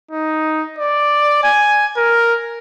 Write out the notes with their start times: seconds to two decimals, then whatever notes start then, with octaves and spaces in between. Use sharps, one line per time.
0.11 D#4
0.79 D5
1.43 G#5
1.97 A#4